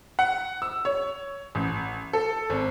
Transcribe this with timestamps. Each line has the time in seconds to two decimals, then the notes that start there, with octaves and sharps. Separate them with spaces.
0.19 F#5
0.62 E6
0.85 C#5
1.55 A1
2.13 A4
2.50 G#1